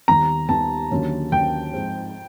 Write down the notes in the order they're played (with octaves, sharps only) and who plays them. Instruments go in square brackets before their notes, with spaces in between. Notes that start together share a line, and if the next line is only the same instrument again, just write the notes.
[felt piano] D#2 D#3 G3 B3 [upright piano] A#5
[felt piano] D#2 D#3 G3 B3 [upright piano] A5
[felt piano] D#2 D3 F#3 A#3 C#4
[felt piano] D#2 D3 F#3 A#3 C#4 [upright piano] G5
[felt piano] G#2 F3 G#3 C4